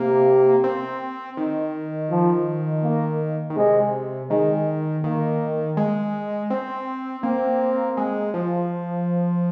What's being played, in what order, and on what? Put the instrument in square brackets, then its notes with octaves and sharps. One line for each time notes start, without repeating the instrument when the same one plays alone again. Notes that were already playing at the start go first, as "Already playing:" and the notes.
Already playing: [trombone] C3 [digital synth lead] A#3
[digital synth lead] C4
D#3
[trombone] F3
A#3
[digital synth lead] D#3
[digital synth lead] C3 [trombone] G#3
[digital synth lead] D#3 [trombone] G#3
[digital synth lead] D#3 [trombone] A#3
[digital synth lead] G#3
C4
[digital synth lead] A#3 [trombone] C4
[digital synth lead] G#3
F3